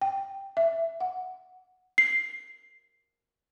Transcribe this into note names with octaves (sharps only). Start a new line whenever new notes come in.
G5
E5
F#5
C7